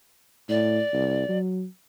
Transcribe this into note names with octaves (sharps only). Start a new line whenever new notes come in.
A2 D5
C2
F#3